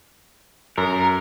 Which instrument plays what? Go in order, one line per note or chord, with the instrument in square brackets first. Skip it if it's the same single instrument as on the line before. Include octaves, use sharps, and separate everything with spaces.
[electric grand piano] F#2 [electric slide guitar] A#4